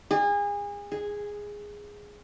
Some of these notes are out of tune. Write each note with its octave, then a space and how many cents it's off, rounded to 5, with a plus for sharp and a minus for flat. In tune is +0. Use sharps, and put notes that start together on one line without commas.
G#4 -30
G#4 -5